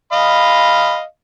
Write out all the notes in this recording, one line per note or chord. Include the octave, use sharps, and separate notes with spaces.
G#3 D#5 F5 B5